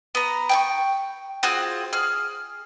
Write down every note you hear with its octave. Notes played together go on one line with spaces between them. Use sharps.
B3 A#5
G5 G#5 C#6
C4 F4 F#4 G#4
G#4 F6